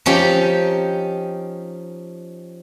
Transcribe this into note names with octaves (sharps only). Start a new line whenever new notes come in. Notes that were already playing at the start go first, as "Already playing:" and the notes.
F3 C#4 D#4 G4